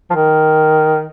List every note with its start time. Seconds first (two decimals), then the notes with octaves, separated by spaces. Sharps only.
0.10 F3
0.15 D#3